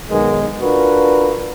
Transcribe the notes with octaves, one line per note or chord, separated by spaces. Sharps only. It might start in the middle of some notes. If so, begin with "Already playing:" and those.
B1 D#3 F#3 G#3 B3 A#4
D4 F4 F#4 A#4 B4